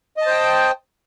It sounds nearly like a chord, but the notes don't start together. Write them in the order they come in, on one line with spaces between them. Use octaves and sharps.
D#5 A5 C5 G5